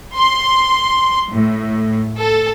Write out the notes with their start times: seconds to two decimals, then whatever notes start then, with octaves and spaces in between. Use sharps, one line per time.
0.15 C6
1.31 A2
2.18 A4